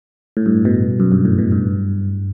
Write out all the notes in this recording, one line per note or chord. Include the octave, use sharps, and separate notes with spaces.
A2
G2
B2
F#2
G2
A2
B2
G2